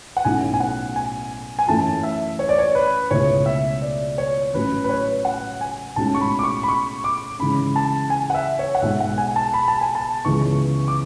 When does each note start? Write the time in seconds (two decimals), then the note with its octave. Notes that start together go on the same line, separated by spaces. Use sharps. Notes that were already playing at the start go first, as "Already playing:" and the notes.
0.17 F#5
0.25 B1 A2 F#3 C#4 E4 G#5
0.54 G#5
0.60 F#5
0.96 G#5
1.59 G#5
1.68 F#2 E3 A3 A5
2.03 E5
2.39 C#5
2.49 D5
2.58 C#5
2.75 B4
3.11 C#2 B2 A3 E4 C#5
3.46 E5
3.82 D5
4.18 C#5
4.54 A1 A2 F#3 C#4 B4
4.84 B4
4.89 C#5
5.25 F#5
5.61 G#5
5.96 B1 A2 G#3 C#4 F#4 A5
6.14 C#6
6.21 B5
6.39 D6
6.44 C#6
6.63 B5
6.69 C#6
7.04 D6
7.39 C#3 E3 G#3 C#4 B5
7.76 A5
8.10 G#5
8.30 F#5
8.35 E5
8.59 C#5
8.75 F#5
8.82 B1 B2 G#3 E5
9.00 F#5
9.18 G#5
9.36 A5
9.54 B5
9.68 A5
9.81 G#5
9.95 A5
10.25 C#2 C#3 E3 G#3 B3 C#6
10.88 D6